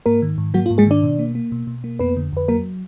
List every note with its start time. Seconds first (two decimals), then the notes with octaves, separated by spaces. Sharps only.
0.06 G#2 A#3 A#4
0.22 D#3
0.38 G#2
0.54 F#3 A#3 F#4
0.66 F4
0.70 G#2
0.78 G#3 G#4
0.87 D#3 D4 D5
1.03 B2
1.19 A#3
1.35 A#3
1.52 B2
1.67 B2
1.84 A#3
1.99 F2 B3 B4
2.17 D3
2.33 F2 B4
2.48 F#3 A#3 A#4